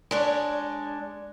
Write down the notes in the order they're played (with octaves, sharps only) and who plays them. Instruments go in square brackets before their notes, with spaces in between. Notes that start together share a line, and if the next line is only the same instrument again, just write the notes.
[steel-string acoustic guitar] G#3 D4 C#5